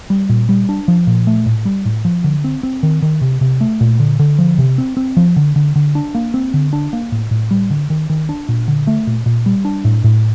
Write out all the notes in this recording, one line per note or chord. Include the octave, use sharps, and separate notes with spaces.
G3
A#2
G3
D4
F3
A#2
A3
A2
G3
A2
F3
D3
C4
C4
D#3
D#3
C3
C3
A3
A#2
D3
D3
F3
C3
C4
C4
F3
D3
D3
D3
D4
A#3
C4
D3
D4
A#3
A2
A2
G3
D3
D#3
D#3
D4
A#2
D3
A3
A#2
A#2
G3
D4
A2
A2